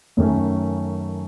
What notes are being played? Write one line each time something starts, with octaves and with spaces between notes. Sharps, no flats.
F#2 D#3 A3 C#4